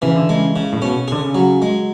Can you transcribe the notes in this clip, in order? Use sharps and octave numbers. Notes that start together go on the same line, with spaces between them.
C#3 E3
D3
C#3 G#3
C#3
A2
B2 C#4
D3 G#4
C#3
F#3
G#3